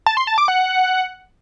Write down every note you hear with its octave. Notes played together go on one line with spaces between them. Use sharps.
A5
C6
A5
D6
F#5